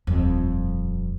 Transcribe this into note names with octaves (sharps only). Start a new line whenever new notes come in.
D#1 F2